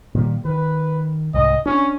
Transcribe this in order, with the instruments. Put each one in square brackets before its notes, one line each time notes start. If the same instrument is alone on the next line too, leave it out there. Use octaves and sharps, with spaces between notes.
[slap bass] A#2 D#3 G3
[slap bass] D#3 [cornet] B4
[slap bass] C2 G#2 [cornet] D#5
[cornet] C#4 [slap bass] D4